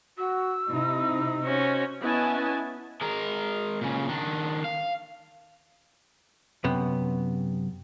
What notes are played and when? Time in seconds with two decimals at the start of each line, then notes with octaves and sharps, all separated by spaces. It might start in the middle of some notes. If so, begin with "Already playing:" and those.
0.18 F#4 E6
0.68 C3 D#4 E4
1.43 C#4 F#4 C5
2.02 B3 C#4 E4 D#5 G#5 A5
3.02 G#3 A#4
3.81 A#2 C#3
4.08 D#3 D4
4.64 F5
6.64 F#2 C3 B3